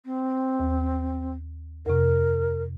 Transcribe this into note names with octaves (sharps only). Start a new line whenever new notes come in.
C4
D#2
F2 C3 A#4